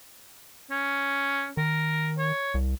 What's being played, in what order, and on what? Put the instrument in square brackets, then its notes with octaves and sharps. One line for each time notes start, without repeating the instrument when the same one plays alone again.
[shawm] C#4
[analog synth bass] D#3 [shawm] A#4
[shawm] C#5
[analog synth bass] C2